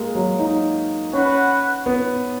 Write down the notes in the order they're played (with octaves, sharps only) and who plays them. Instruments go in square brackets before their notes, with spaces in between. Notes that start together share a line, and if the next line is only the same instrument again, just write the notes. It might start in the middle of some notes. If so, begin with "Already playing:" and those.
Already playing: [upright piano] G#3 A#3
F#3
D#4
[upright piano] C#4 [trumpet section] F#4 B4 F#5
[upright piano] B3